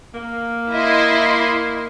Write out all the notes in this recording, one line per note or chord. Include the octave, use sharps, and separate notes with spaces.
A#3
E4 D#5 C6